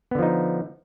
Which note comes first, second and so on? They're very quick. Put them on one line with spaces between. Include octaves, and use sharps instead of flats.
B3 D3 F3 D#4